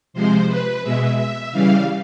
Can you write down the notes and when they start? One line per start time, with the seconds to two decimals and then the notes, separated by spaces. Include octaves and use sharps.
0.14 C3 F3 G#3 C5
0.48 B4
0.82 B2 G#3 E5
1.16 E5
1.51 C#3 E3 G3 F5